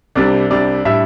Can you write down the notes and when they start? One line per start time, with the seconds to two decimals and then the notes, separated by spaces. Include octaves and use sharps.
0.15 C2 C3 G3 D4 D5
0.50 C2 C3 G3 D4 D5
0.85 A2 G3 D4 E5